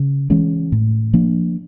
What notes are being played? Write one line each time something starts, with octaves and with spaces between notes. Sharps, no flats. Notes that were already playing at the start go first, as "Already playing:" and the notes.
Already playing: C#3
E3 G#3 C#4
A2
F3 A#3 D4